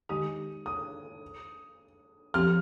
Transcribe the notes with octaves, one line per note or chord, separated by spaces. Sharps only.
D#3 G#3 D#4 G4 D#6
D#6
F3 C4 G4 F6